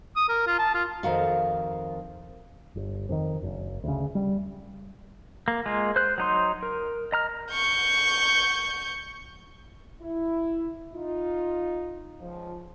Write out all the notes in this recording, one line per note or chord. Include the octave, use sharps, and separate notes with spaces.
D#6
A#4
F4
A5
F4
F2 D#3 F#4 F5
G1
F2 D3 D#3
F#1
D2 C#3
G3
A#3
G#3 A#3 F4
C5 F#6
F#3 D#4 C6
A#4
D#5 A#5 F6
C#6 G6
E4
D#4 F4
C#2 F3